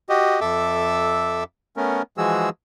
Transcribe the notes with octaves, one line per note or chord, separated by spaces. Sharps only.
F#4 G4 D#5
F2 A4 E5 D6 E6
A3 B3 C#4 A#4
E3 F3 G#3 F#4 G#4 E6